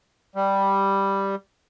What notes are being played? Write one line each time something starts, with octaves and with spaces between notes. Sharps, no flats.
G3